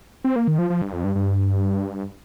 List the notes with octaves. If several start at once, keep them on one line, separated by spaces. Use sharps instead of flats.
C4
A#3
D#3
F3
F3
G2
F2
G2
G2